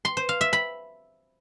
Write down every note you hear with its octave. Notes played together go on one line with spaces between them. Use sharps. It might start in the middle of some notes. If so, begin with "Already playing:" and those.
C6
C5
F5
E5
B5